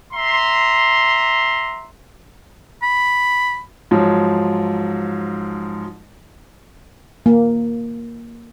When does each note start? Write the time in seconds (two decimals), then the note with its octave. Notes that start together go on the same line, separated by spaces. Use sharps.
0.13 E5 A#5 C6
2.82 B5
3.91 G#2 F3 F#3
7.26 A#3